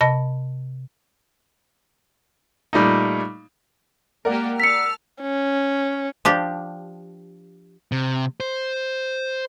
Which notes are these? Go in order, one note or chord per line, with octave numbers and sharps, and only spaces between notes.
C3 D#5 A5 B5 A#6
A#2 G3 A3 D#4
G#3 A#3 G4 A#4 D5 F#5
A5 E6 F6 B6 C#7
C#4
F3 D4 G4
C3
C5